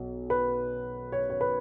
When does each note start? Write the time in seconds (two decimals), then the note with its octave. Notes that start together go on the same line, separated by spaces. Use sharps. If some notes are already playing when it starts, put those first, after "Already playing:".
Already playing: B1 B2
0.30 B4
1.12 C#5
1.30 C#5
1.41 B4